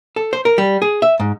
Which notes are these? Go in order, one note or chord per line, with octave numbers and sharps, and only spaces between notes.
A4
C5
A#4
G3
G#4
E5
G#2